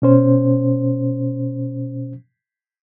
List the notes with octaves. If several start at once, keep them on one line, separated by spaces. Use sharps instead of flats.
B2 C#4 C5